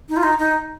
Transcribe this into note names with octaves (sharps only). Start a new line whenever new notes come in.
D#4
F4
D#4
D#4